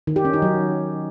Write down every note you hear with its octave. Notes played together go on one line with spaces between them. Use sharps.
D#3
G4
C#4
D#4
F#3